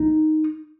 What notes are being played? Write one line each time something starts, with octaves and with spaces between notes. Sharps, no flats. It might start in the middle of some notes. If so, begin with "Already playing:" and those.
Already playing: D#4